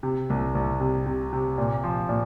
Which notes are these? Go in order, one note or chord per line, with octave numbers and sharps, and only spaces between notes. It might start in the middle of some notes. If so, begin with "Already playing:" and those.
C3
C2
C2
C3
C3
C3
A#2
F3
A#2